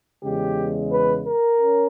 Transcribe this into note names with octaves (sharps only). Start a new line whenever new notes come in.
E2 C#3 G#3 G4
B4
A#4
C#4